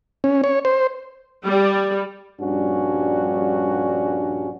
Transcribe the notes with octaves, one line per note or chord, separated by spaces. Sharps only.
C#4
C#5
C5
G3
A#1 G2 G3 C#4 D4 F#4